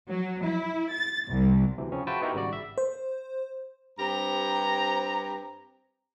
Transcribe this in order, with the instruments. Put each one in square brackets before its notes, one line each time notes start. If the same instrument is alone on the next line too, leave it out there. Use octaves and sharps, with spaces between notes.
[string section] F#3
E4
A6
C2
[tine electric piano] D2 C3 E3
C#3 F3 C4 C#4
F4 F#4 B4 E5 G5 A5
B3 D#4 E4 F#4 G4 A#4
G#1 C#3 G3 F#4 D5
E5
[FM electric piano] C5
[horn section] G2 C4 G4 A#5